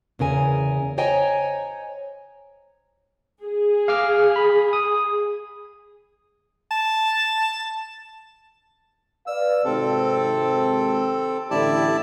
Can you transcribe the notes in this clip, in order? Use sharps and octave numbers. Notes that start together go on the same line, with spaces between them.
E2 C#3 A#4 G#5
C5 C#5 D#5 G5 G#5 A#5
G#4
F5 D6 F6
B5
D#6
A5
B4 D5 F5 E6
G#1 C3 C4 A4
A1 D3 E4 G4 D5 A5